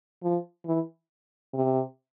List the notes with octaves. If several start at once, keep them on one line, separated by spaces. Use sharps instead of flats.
F3
E3
C3